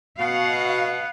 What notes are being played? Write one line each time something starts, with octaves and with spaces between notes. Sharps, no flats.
B2 B3 F#4 F5 F#5